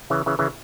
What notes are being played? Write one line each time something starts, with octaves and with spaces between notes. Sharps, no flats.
C#3 E3
C#3 E3
C#3 E3